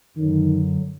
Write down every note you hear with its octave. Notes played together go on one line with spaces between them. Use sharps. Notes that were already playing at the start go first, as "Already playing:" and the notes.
F#2 D3 D#3 F#3